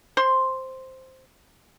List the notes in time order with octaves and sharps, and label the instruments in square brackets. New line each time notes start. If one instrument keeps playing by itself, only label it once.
[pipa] C5 C6